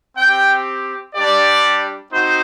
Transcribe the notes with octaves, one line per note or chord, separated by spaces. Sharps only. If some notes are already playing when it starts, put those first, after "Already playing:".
C4 G4 G5
G3 D4 G4 D5
C4 D#4 F#4 C5